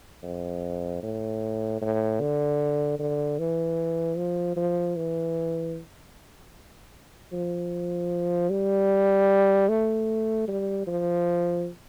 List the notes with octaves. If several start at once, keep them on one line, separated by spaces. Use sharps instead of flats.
F2
A2
A2
D3
D3
E3
F3
F3
E3
F3
G3
A3
G3
F3